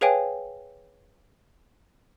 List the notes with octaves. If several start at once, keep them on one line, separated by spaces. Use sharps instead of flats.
G#4 B4 C#5 F5 G5 G#5